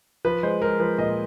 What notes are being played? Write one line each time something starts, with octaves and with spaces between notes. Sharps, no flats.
F3 B4
G#3 C5
G#3 A#4
F3 B4
A#2 D#5